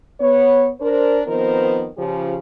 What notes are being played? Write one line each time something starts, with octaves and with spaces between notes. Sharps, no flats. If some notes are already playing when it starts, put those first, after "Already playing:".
B3 C#5
D4 A#4 C5
D#3 F3 B3 C4 A#4 C5
C#3 F3 G4